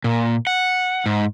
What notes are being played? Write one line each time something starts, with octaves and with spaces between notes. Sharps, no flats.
A#2
F#5
G#2